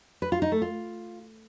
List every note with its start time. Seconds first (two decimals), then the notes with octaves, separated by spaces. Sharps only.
0.22 B4
0.32 F4
0.42 D#4
0.52 A3
0.62 F4